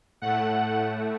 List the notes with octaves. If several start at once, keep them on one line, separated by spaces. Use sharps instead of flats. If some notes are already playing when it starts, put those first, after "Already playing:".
A2 A3 F#5